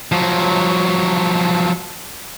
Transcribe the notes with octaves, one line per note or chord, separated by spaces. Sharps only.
F3 F#3